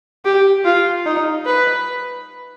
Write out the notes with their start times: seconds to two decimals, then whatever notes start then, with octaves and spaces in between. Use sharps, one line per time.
0.25 G4
0.65 F4
1.06 D#4
1.46 B4